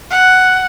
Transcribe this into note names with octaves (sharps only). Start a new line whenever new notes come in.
F#5